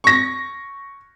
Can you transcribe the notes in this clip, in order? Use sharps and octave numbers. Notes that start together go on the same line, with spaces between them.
C#6 A#6